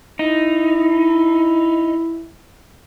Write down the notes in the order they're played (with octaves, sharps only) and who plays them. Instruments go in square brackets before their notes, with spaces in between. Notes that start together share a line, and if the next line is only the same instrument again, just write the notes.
[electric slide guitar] D#4 [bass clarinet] E4